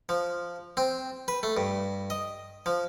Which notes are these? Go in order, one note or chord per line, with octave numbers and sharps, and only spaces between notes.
F3
C4
B4
A3
G2
D#5
F3